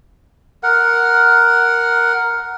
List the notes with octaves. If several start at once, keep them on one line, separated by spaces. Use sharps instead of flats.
A#4 F#5